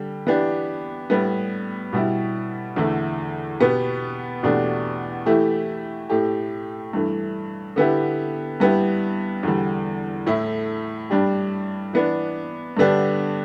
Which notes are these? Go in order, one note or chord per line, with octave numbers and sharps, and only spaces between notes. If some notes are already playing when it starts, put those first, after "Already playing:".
Already playing: D3 G3 G4
E3 B3 D4 G4
A2 G3 B3
B2 G3 E4
E2 D3 A3 E4
B2 B3 G4
E2 B2 A3 D4 G4
E3 A3 E4 G4
A2 A3 G4
G2 E3 A3
D3 B3 E4 G4
G2 G3 B3 E4 G4
E2 D3 G3
A2 A3 E4
G2 G3 D4 G4
E3 B3 D4
G2 D3 B3 D4 G4